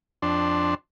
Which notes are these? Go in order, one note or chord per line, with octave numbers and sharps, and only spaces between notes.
F2 D4 C6